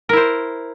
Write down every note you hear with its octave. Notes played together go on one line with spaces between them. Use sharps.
E4 A#4 C5